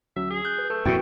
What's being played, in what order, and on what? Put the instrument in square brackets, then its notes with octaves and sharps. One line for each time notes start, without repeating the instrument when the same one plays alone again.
[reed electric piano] D2 F#3 C#4 [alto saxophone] E5
[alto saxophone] G#4
[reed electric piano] F#6 [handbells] G6
[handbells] B4
[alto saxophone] A3 [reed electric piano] A4 [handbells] B4
[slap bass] F2 A#2 [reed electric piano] E4 [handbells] F#4 G5